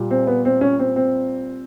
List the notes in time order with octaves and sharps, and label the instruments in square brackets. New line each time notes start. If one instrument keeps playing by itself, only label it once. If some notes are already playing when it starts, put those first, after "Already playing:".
Already playing: [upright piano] A#2 G3
[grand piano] C4
B3
C4
C#4
C4
C4